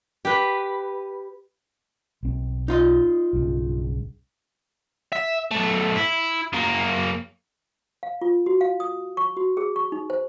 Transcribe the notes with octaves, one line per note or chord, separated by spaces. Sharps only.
G4 B4
B1 C4
D#4 F4 D#5
B1 G2 C#3
E5
B1 A3
E4
F#2 A#3
F5
F4
F#4
F5
D#6
C#6
F#4
G#4
C#6
D#4
C5